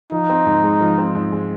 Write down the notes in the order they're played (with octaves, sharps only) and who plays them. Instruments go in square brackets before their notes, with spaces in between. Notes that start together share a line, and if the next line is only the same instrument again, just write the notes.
[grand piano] F3 [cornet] D#4
[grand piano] C4
G#2
G#3
F3
C4
G#2
G#3